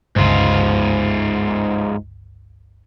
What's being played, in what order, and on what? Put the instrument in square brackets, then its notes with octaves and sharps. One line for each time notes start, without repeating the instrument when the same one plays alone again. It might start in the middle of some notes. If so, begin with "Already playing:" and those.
[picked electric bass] G1 C#2 [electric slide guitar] G#2 F4